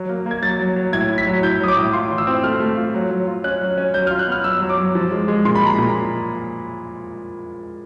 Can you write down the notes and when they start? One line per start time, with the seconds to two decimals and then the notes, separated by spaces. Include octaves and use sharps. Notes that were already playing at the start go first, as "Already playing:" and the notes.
Already playing: F#3
0.09 A#3
0.26 A#3 G#6
0.42 F#3 A6
0.59 F#3
0.76 F#3
0.92 A2 G#6
1.09 E4
1.18 B6
1.27 F#3
1.43 E4 G6
1.60 F#3 D#6
1.68 D6
1.76 A2
1.93 F4 C6
2.10 E3
2.18 E6
2.27 C4
2.43 A3 F6
2.60 A3
2.76 F4
2.94 F#3
3.11 F#3
3.27 F4
3.44 C#4 F#6
3.61 F#3
3.78 C#4
3.94 F#3 G6
4.07 F4 F6
4.19 F#6
4.28 B3 F6
4.44 F#3 E6
4.61 F#3
4.70 D6
4.78 F#3
4.95 F3
5.12 G#3
5.28 G#3
5.45 A#2 C6
5.55 B5
5.62 G#3 A#5
5.76 A#2 B5